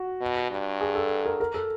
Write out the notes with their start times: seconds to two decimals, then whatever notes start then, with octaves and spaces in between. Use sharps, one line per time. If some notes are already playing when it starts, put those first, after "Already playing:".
Already playing: F#4
0.21 B2
0.51 G2
0.81 G#4
0.95 A4
1.26 A#4
1.40 A#4
1.54 A4